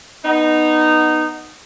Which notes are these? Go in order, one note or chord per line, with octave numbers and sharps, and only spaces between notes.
B3 D#4